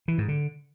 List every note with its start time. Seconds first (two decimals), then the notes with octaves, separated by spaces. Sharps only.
0.08 E3
0.18 G#2
0.28 D3